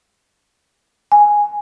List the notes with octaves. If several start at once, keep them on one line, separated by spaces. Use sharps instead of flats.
G#5